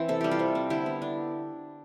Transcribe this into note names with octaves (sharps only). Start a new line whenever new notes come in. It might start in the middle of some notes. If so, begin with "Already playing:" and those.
Already playing: E3 C4
C3 A4
G3 G4
F4 A4
C3
C4
D3 E4 G4
B3
D4